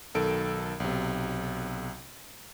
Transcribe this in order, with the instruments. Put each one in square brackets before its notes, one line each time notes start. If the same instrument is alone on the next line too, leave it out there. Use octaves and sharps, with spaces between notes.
[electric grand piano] B1 D#3 A4 A#4 D7
B1 C3